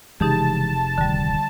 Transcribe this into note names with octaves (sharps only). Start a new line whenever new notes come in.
F1 C#3 E3 G#3 D#4 G4 G#4 A5
D1 D3 D#3 G3